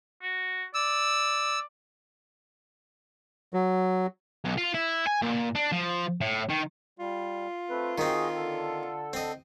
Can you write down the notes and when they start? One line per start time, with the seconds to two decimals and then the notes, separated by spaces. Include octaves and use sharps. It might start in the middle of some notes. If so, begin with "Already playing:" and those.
0.22 F#4
0.74 D5 E6
3.54 F#3
4.45 B1
4.58 F4
4.74 E4
5.07 G#5
5.22 A#2
5.55 D4
5.72 F3
6.21 A2
6.49 D#3
6.99 G3 F4
7.70 A3 C4 B4
7.98 D#3 C4 F#4 G#4 D#5
8.36 D3 A4
9.13 C4 D#5